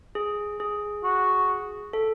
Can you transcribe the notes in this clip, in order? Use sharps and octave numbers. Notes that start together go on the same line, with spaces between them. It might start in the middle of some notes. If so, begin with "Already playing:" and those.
G#4
G#4
F#4
A4